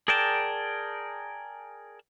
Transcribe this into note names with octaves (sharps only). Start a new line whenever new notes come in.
G#4 A#4 D5 G5 A5